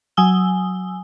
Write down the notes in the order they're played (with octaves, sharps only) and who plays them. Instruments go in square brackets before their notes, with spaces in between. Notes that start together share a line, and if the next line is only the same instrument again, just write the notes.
[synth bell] F#3 G#5 D#6 E6 G7